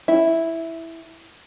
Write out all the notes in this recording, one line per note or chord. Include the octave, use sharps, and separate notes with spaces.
E4